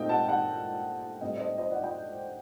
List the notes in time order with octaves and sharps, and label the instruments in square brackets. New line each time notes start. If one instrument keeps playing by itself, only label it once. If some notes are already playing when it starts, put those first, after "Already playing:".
Already playing: [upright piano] A#2 A3 C4 D#4 D#5 G5
F#5 A5
F#5 A5
A2 G3 C4 D#5 G5
D5
C5 D#5
C5 D#5
D5 F#5
D#5 G5